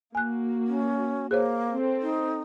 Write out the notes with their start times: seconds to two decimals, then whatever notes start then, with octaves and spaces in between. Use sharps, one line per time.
0.15 A#3 F#4 G#5 F#6
0.67 C#4
1.31 A#3 G#4 C5 C#5
1.71 C4 A4
2.02 D#4